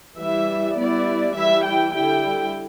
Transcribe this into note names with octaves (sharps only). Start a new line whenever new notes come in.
E3 G3 E4 E5
G3 B3 E4 D5
E3 G3 E4 E5
G5
D3 G3 E4 G5